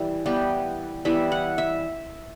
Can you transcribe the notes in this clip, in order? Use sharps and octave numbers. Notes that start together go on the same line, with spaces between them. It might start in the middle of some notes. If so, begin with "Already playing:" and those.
Already playing: E3 G3 E5
E3 G3 B3 G4
E3 G3 B3 E5
F#5
E5